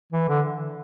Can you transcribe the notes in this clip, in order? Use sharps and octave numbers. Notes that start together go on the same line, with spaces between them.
E3
D3